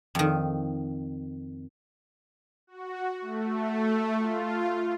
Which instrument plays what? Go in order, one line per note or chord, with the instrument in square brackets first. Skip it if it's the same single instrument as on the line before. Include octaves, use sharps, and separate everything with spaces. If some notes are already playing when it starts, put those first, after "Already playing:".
[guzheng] F2 D#3
[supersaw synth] F#4
A3
F4